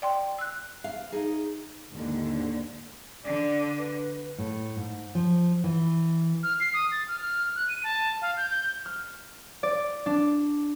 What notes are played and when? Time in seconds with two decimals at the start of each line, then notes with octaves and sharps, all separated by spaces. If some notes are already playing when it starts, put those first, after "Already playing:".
0.02 D5 G5 C6
0.39 E6 F#6
0.84 F5
1.12 D#4 G#4
1.91 D#2 G#2 D3
3.24 D3 D5
3.78 B4
4.38 A2
4.76 G#2
5.15 F3
5.64 E3
6.43 F6
6.60 C7
6.74 D#6
6.92 A6
7.08 F6
7.20 F6
7.56 F#6
7.68 D#7
7.84 A5
8.22 F5
8.37 G6
8.50 G6
8.85 F6
9.63 D5
10.06 D4